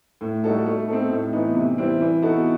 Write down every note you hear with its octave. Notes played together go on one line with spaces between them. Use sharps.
A2
G3 D#4 F#4 A4
A3
C4 D#4 A4
A2
E3 B3 D#4
C3
E3 G3 C4
E3
B3 D#4 F#4 A4